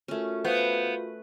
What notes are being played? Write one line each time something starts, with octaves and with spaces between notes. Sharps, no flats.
A3 C#4 F4 F#4 A#4
B3 B4 C5 F5